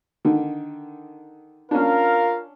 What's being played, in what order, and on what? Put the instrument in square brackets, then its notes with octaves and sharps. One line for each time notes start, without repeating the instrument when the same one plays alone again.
[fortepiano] D3 D#3
[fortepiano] C#4 D4 [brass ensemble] F4 A#4 F5